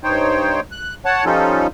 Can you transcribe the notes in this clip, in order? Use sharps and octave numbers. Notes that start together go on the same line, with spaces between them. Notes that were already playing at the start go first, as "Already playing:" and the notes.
G2 D#4 C5 C#5 G5
F#6
C#5 F#5 A5
F3 G3 C#4 D#4 F4 A4